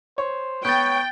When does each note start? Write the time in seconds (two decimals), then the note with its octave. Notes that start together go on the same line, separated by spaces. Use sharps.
0.18 C5 C#5
0.65 B3 C#5 G5 G6 A6